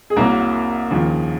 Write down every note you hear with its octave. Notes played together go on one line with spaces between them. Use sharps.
G#4
C2 C3 F#3 A#3 A#4
D#2 C#3 F3